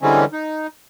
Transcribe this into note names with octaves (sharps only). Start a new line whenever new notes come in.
D3 E3 G3 G#3 C4 C#4
D#4